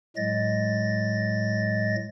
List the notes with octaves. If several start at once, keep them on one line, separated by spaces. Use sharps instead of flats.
A2 F#3 G#3 D#5 A6 A#6